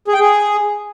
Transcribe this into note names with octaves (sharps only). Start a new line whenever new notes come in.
G#4
G5
G#4